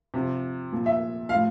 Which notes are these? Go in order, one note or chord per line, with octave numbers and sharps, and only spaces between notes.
C3 F3
A#2 F3
E5
F3 F5
A2